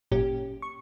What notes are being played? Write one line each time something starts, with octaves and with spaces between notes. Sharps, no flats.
G#1 F#2 A#2 C#4 G4
C#6